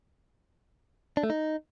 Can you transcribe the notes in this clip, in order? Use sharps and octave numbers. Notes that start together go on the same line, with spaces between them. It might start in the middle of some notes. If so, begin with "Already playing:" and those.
D4
A3
D#4